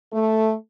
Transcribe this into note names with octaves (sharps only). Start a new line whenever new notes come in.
A3